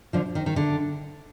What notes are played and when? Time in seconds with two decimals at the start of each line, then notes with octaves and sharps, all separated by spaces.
0.13 D3 F3
0.35 D#3
0.46 D#3
0.56 D3